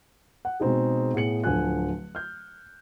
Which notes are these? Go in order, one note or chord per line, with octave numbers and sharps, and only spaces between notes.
F#5
B2 G#3 C4 D#4 G#4
A2 B3 G#4 C#7 F#7
D1 D3 F3 G#5 F#6
F6 G6